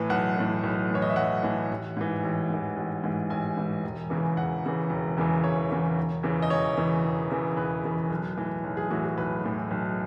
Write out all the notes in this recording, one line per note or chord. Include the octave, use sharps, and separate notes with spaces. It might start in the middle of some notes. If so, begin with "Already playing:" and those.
Already playing: A2 E3 B4
B1 F#5
A2 E3
B1
A2 E3 C#5
D#5
E5
B1 F#5
A2 E3
A1
G#2 E3
A1
G#2 E3
A1
G#2 E3
A1 G#5
G#2 E3
E1
E2 C#3 E3
E1 F#5
E2 C#3 E3
E1
E2 C#3 E3
E1 C#5
E2 C#3 E3
E1
E2 C#3 E3
D#5
E1 C#5
E2 C#3 E3
E1
E2 C#3 E3
E1 B4
E2 C#3 E3
B1
A2 E3
B1
G#4
A2 E3 F#4
G#4
B1 B4
A2 E3
B1